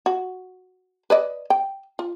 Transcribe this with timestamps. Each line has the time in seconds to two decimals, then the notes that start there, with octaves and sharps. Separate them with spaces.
0.06 F#4
1.10 B4 D5 D#5
1.50 G5
1.99 F4